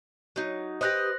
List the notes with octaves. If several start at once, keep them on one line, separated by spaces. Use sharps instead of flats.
F#3 D#4
G4 B4 C5 D#5 F#6 A#6